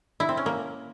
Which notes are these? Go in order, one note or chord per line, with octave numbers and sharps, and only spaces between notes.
E4
C4
C#4
A#3